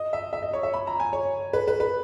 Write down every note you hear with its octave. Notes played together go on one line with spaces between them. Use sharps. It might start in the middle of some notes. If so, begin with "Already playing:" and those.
Already playing: D#5
E5
E5
D#5
C#5
E5
B5
A#5
G#5
C#5
B4
B4
B4